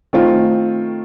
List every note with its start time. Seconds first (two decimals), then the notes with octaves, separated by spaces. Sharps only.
0.13 D#3 A3 C4 F4